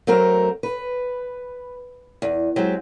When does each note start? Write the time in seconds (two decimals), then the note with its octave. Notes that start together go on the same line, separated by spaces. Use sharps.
0.07 F#3 A3 C4 A#4
0.63 B4
2.22 E2
2.56 F#3 G#3 C4 G4